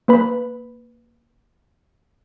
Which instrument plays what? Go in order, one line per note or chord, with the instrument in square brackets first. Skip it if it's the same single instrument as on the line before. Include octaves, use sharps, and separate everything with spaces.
[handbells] A#3 B4 B5